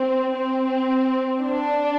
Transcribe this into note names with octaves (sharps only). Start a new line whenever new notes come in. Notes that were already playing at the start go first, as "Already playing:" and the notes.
Already playing: C4
C4
D4